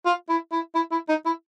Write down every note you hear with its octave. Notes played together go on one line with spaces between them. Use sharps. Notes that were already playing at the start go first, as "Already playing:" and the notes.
F4
E4
E4
E4
E4
D#4
E4